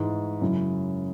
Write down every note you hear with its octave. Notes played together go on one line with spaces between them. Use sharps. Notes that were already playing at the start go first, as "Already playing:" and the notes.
Already playing: G#2 E3 G#3
F#2 C#3 F#3 C#4 E4